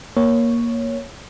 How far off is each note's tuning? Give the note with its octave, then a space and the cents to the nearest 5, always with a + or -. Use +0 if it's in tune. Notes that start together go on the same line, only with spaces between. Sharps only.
A#3 +10 C#5 +0